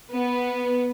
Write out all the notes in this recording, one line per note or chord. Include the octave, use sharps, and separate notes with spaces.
B3